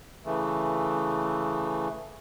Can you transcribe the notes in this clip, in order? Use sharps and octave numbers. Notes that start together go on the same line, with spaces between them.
C#3 E3 A3